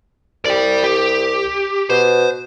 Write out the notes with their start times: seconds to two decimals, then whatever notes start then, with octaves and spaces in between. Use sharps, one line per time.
0.46 C2 D5 G5
0.84 G4
1.90 B2 C5